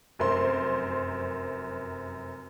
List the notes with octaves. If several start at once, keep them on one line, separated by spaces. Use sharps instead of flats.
F1 F#2 A#4 C5 C6